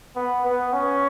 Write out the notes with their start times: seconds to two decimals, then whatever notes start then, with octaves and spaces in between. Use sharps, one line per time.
0.16 B3
0.45 B3
0.73 C#4